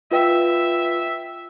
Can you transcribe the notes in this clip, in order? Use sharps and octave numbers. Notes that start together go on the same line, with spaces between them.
F4 B4 E5 G5